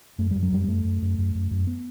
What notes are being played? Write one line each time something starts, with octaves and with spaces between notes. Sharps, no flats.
F#2 A3
F#2 G3
F#3
F#2 G3
B3
F#2 A3
F#2
F#2
F#2
F#2
F#2
B3